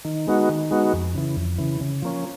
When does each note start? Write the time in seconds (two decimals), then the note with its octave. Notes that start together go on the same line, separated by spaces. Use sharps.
0.05 D#3
0.27 G#3 B3 D#4 F#4
0.49 D#3
0.71 G#3 B3 D#4 F#4
0.94 F2
1.15 C#3 E3
1.37 F2
1.58 C#3 E3
1.81 C#3
2.02 F3 A#3 C#4